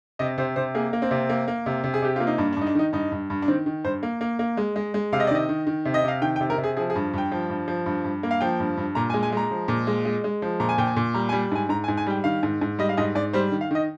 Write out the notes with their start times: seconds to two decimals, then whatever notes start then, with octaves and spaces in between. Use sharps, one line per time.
0.19 C3 D#5
0.38 C3 C5
0.56 C3 C5
0.75 A#3 G#4
0.93 A#3
1.02 C4
1.11 C3
1.29 A#3
1.48 A#3
1.66 C3
1.84 C3
1.94 G#4
2.02 C3 G4
2.16 A#3 F4
2.27 D#4
2.38 G2 D4
2.53 D4
2.57 G2 D#4
2.67 D4
2.75 D#3 D#4
2.93 G2 D#4
3.12 G2
3.30 G2
3.42 D4
3.48 D#3 C4
3.66 D#3
3.84 G2 C5
4.03 A#3
4.21 A#3
4.39 A#3
4.57 G#3
4.76 G#3
4.94 G#3
5.12 C3 F5
5.20 D#5
5.27 D5
5.31 D#3 D#5
5.49 D#3
5.67 D#3
5.85 C3
5.94 D#5
6.04 C3 F5
6.22 D#3 G5
6.36 G5
6.40 C3
6.50 A#4
6.58 C3
6.64 G#4
6.77 F3 G#4
6.90 G#4
6.96 G2
7.13 G2 G5
7.32 F3
7.49 G2
7.68 F3
7.86 G2
8.04 G2
8.23 A#3
8.31 F5
8.41 F3 G5
8.60 G2
8.77 G2
8.95 A#2 A#5
9.10 G#5
9.14 G#3
9.23 G#5
9.32 G#3 A#5
9.51 F3
9.68 A#2
9.87 G#3
10.05 G#3
10.24 G#3
10.42 F3
10.60 A#2 A#5
10.69 G#5
10.78 A#2 G5
10.87 G#5
10.96 A#2
11.14 G3 A#5
11.29 G#5
11.32 G3
11.52 G#2 G#5
11.69 G#2 A#5
11.84 G#5
11.88 G#2
11.97 G#5
12.07 G3 G5
12.24 D#3 F5
12.43 G#2
12.61 G#2
12.79 G3 D#5
12.89 F5
12.97 G#2 D#5
13.15 G#2 D5
13.33 G3 C5
13.52 D#3
13.61 F5
13.71 D#3 D#5